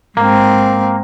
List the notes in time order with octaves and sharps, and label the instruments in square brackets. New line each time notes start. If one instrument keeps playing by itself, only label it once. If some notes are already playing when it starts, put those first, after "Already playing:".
[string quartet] G#2 C4 [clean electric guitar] A#3